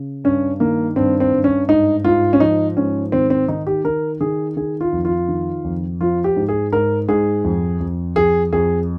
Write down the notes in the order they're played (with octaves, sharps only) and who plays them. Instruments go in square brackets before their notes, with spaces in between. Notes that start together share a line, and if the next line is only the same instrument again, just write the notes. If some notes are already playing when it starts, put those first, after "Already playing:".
Already playing: [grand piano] C#3
G2 C#4
D#3 A#3
G2 C4
C4
G2
C#4
G#2 D#4
G#2 F4
C#4
F3 D#4
G#2 C#4
D#3 C4
C4
D#3 D#4
G4
D#3 A#4
D#3 G#4
D#3 G#4
F4
F2
F4
D#3
F2
F3 F4
G4
G#2
G#4
G#2 A#4
G#2 G#4
F2
F2
F2 G#4
F2 G#4